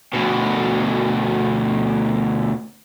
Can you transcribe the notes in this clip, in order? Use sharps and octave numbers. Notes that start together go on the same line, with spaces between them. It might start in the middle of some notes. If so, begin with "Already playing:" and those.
D2 B2